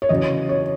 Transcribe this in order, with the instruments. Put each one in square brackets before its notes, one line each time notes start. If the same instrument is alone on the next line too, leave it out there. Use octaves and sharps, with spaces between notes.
[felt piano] C#5
[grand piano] E2 C#3 F#3 C#4 [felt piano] D#5
[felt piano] C#5